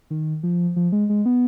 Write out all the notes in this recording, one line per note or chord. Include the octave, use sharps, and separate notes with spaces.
D#3
F3
F3
G#3
G#3
B3